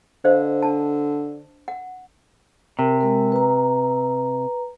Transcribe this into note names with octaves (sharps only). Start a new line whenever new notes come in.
D3 C5 D#5 F5
D4 A5
F#5
C3 A#4
G#3 A#4
B4 A#5